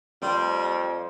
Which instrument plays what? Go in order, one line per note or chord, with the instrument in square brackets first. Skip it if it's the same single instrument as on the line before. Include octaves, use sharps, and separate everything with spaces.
[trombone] F2 [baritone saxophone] G3 [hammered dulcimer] C5 D5 G5